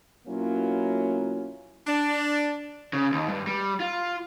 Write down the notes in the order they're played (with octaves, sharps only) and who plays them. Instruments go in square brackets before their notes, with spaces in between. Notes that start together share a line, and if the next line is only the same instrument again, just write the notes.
[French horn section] B2 F#3 A#3 C#4 E4 F4
[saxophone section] D4
[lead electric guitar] C#3
D#2
G2
G3
F4